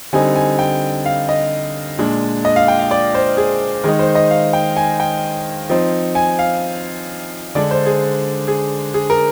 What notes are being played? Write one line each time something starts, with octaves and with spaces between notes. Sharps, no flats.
D3 G3 C4 D#4 G#5
G#5
G5
F5
D#5
A#2 G#3 D4
D#5
F5
G5
F5
D5
C5
G#4
D#3 G#3 D#4 G#4
C5
D#5
F5
G5
G#5
G5
F3 C4 D#4
G#5
F5
D3 G#3 D4 D5
C5
G#4
G#4
G#4
A#4